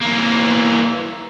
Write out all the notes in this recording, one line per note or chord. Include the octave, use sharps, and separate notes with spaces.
E3 A#3